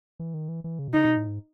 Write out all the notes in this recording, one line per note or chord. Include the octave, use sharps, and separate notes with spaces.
E3
D#3
E3
E3
C#3
B2
C#3 D#4
B2
A2
G#2